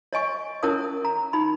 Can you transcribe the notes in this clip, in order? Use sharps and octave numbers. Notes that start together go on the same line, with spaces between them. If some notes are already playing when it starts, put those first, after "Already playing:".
C#5 D#5 G#5 C#6
C#4 E4 A#4 C#5 A5 D#6
A#5
D#4 B5